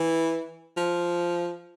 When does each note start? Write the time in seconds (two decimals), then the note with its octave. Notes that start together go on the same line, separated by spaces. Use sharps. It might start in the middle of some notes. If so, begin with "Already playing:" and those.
Already playing: E3
0.77 F3